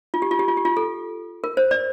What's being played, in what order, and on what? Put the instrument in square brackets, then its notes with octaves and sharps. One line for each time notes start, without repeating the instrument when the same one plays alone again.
[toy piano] F4
G4
F4
G4
F4
G4
F4
A4
A#4
C5
D5